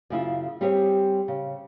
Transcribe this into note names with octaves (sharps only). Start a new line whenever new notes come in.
F#2 C#3 E4 F4
G3 C4 G4 G#4 C#5
C#3